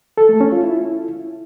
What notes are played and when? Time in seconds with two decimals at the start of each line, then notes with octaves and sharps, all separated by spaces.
0.18 A4
0.29 A3
0.41 C#4
0.52 F4
0.64 E4